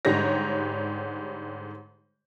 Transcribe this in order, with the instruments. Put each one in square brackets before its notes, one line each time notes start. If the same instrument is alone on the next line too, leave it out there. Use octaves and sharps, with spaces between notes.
[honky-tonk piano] G#2 D3 G3 G4 C#5 A#6